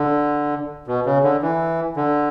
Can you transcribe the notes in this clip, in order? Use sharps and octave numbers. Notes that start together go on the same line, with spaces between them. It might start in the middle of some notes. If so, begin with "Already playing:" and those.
Already playing: D3
B2
C#3
D3
E3
D3